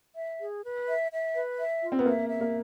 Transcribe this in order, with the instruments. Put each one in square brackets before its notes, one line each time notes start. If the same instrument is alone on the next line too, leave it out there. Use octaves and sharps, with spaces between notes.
[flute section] E5
G#4
B4
E5
E5
B4
E5
F4
[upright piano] C4
B3
[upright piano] A#3 [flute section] E5
[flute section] E5
[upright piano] A#3